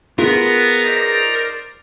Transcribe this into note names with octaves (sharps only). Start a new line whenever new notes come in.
B3 F4 G#4 A#4 B4
D#4 C5 D5